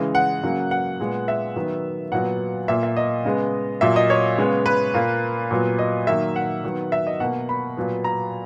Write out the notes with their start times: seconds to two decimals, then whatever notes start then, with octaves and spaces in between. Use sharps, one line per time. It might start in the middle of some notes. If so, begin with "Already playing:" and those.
Already playing: C#3 E3 G#3
0.15 F#5
0.44 C#3 F#3 A#3
0.71 F#5
1.00 A#2 G#3 B3
1.28 E5
1.56 D#3 F#3 B3
2.12 A#2 F#3 B3 F#5
2.68 A#2 A#3 E5
2.83 E5
2.96 D#5
3.25 C#3 G#3 B3
3.81 A#2 F#3 A#3 E5
3.96 D#5
4.10 C#5
4.38 C#3 G#3 B3
4.66 B4
4.94 A#2 A#3
5.51 A#2 F#3 B3
5.79 D#5
6.07 D#3 F#3 A#3 E5
6.36 F#5
6.64 D#3 F#3 B3
6.92 E5
7.07 D#5
7.20 B2 A#3 F#5
7.49 B5
7.77 A#2 F#3 B3
8.04 A#5